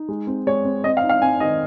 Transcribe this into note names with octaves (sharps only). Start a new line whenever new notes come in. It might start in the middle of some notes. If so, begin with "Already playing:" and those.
Already playing: D#4
G#3
C4
G#3 C#5
C4
C4 D#5
F5
D#4
F5
C4 G#5
D#3 D#5